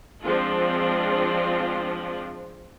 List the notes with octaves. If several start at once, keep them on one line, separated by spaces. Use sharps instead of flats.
F3 G#3 C4 D4 F4